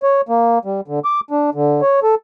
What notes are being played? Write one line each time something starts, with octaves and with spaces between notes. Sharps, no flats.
C#5
A#3
G3
D3
D6
D4
D3
C#5
A4